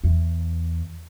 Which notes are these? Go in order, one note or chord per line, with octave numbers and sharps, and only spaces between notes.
E2